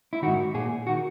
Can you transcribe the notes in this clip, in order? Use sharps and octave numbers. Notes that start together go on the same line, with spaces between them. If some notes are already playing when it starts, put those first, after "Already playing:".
E4
G#2 D#3 F#4
A#2 G#4
D#3 F#4